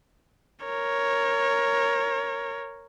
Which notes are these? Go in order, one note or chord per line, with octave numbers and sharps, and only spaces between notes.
A#4 C#5